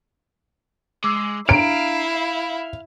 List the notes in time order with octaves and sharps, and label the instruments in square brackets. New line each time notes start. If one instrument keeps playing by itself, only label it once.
[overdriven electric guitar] G#3 [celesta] D6 E6 C7
[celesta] D4 A#5 [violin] E4 [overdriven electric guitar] F5 [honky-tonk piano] D7
[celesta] E5